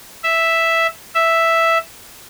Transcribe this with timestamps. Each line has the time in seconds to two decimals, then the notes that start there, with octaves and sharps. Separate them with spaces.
0.24 E5
1.15 E5